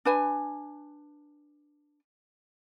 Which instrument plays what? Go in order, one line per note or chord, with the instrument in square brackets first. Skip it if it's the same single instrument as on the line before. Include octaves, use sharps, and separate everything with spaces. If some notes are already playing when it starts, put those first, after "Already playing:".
[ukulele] D4 B4 G#5